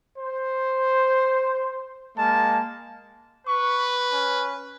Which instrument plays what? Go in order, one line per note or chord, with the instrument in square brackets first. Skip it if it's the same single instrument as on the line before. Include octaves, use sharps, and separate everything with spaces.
[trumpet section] C5
G#3 A#3 A5
[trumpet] B4 [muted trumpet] C#6
[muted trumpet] C#4